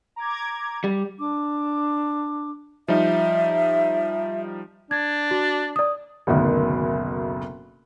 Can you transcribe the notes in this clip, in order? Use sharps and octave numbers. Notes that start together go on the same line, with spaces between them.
A#5 D6 G#6
G3
D4 D6
F3 G3 D#4 E5
D4 G#6
F#4
D5 D#6
F#1 D2 B2 D#3